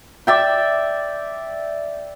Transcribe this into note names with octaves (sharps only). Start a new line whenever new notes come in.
D5 E5 G5